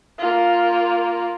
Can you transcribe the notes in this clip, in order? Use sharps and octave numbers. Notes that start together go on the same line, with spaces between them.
A#3 F4